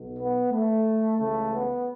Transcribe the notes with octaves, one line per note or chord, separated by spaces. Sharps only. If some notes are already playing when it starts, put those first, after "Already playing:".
Already playing: B1 B2
B3
A3
C#2 C#3 E3 A3
B3